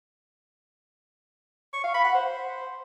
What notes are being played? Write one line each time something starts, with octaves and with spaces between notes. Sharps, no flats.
C#6
F5
B5
F#5
C5